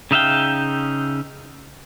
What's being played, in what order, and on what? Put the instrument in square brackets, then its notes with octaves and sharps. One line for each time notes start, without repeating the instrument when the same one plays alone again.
[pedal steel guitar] C#3 D#4 E5 F5 G5